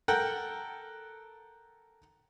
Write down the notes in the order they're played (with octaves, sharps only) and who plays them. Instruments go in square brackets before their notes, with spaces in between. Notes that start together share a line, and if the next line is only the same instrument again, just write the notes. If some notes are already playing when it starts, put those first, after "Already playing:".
[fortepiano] A4 A#4 F#5 G5